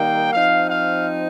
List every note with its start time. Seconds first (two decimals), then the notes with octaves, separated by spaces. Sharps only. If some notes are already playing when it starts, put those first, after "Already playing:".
Already playing: D#3 G3 A#3 D#4 G5
0.32 F3 C4 D#4 F5
0.68 F5